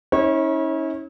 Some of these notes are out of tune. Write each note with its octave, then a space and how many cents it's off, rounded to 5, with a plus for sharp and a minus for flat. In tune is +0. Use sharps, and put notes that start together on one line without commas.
C#4 +0 E4 -45 C#5 -30